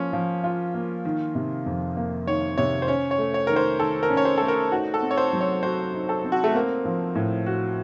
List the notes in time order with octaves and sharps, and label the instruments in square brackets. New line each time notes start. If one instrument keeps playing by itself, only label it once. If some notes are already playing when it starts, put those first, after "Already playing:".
Already playing: [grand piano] F3 A#3 [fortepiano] C#4
[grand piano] F3
F4
A#3
D#3
C3
F2
A#3
[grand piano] D#3 [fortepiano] C#5
[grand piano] C3 [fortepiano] C#5
[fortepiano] C5
[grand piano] C#4 [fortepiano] C#5
[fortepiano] C#5
[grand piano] A3
[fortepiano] C#5
[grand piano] D#3 [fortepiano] A#4
[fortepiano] C5
[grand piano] D#3 [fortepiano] A4
[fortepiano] A#4
[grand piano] C#4
[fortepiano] C#5
C5
[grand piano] A3 [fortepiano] A4
[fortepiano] A#4
[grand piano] D#4 [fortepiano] F#4
[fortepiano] A4
[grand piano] C4
[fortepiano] C#5
C5
[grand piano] F#3
[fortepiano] C#5
[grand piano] F#4 [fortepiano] C5
[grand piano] D#4
[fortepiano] A4
[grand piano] C4
[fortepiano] F#4
A3
[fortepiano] A#3 [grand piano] C4
[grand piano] F3
A2
F#4